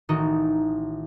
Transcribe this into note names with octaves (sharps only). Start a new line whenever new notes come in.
A1 D#3 D#4 F#4